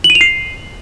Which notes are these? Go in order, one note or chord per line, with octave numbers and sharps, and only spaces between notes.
F#7
D#7
F7
C7